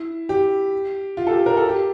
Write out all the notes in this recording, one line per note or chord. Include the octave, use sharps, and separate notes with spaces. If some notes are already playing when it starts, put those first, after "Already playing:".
Already playing: E4
G4
F4
A4
G4
A#4
A4
G4